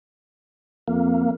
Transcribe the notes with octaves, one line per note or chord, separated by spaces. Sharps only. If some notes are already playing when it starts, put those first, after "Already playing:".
F2 A#3